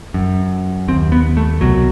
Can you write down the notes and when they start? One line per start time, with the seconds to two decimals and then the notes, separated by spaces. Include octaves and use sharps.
0.14 F#2
0.88 D#2 C4
1.12 B3
1.37 A3
1.61 C2 B2 F#3